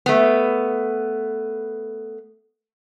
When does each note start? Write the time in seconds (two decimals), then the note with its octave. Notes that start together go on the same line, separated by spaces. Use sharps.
0.06 A3 B3